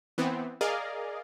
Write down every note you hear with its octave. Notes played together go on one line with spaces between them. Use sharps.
E3 B3 C4
G#4 A#4 D5 D#5 F5